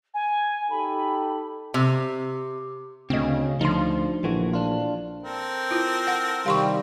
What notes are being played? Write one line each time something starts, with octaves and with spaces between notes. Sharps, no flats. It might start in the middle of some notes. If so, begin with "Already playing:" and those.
G#5
D#4 G4 A4 B5
C3
D2 C#3 C4 D#5
D2 F3 D#4 C6
A#1 E3 A3 F#4
D4 F4
C4 A4 A#4
E4 F4
F#5
C3 D#3 G3 F5 C6 C#6